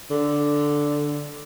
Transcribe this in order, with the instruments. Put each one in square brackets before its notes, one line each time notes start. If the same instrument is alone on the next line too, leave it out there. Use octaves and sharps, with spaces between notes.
[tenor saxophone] D3